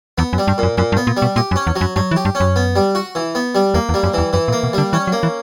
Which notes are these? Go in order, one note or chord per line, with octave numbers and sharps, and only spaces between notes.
E2 B3
F#2
G3
G2
F#2 A#2
F#2 A#2
G2
B3
A#2
G3
B2
A#2 G4
F#2
C#4
E2
F#3
F#2
G2 F#3
E3
G4
G2
C#4
F#2
B3
G3
F#4
E3
B3
G3
E2 A#3
E2
G3
F#2
E2 E3
F#2 E3
A#2
A#3
B2
D3 G3
E3 C#4
F#3
A#3
E3